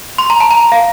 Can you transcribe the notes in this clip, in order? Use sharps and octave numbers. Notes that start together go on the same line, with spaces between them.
C6
A#5
A5
A#5
F5